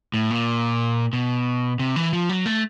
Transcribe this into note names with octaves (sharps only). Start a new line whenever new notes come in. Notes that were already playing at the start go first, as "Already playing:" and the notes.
A2
A#2
B2
C3
E3
F3
F#3
A3